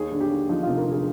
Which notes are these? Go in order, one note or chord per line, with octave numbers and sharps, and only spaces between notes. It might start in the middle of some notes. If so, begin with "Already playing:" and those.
Already playing: D#2 G#4
D3
G4
D#2
F3 D#4
F1 F4
A#4
D3 G#4